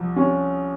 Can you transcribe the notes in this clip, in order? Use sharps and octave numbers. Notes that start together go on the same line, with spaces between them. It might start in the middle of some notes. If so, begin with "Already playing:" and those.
Already playing: C2 F3
C#4